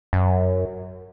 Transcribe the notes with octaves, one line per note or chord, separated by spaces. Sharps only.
F#2